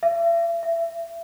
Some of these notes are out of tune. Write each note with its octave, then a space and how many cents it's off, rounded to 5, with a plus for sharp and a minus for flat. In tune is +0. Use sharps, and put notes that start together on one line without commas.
E5 +40
E5 +25